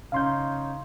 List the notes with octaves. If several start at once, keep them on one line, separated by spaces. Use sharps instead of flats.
C#3 C#4 D#4 F5 C6 G6